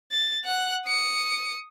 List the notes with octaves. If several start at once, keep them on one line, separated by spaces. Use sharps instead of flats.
A6
F#5 F#6
D#6 C#7